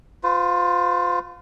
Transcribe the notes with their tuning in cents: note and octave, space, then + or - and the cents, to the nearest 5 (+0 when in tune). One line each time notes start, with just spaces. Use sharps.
F4 +20 C5 -40